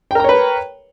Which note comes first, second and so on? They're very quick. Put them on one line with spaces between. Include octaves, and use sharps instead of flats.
G5 A#4 A#5 C#5 B4